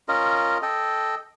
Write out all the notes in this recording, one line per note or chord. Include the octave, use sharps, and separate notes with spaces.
C#4 F4 A#4 D#5
A4 D#5 G5